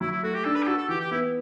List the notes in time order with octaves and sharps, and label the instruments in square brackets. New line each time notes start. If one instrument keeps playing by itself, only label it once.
[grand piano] F#3 [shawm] E4
[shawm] E4
[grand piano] A3 [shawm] F#4
[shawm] G4
[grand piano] D4 [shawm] A4
[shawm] B4
G4
[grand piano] F#4 [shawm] A4
[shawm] A4
[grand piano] E3 [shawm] G4
[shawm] G4
[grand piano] B3 [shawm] E4